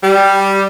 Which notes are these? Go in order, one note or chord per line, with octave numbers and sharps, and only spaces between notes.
G3